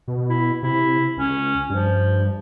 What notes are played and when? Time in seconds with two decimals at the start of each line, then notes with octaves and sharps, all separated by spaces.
0.08 B2
0.30 E4
0.63 C3 E4
1.17 C#2 C#4
1.70 G2 F3